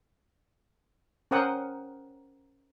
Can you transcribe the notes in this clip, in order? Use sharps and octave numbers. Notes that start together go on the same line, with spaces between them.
C#4 A#4 C5 F#5 G5 D#6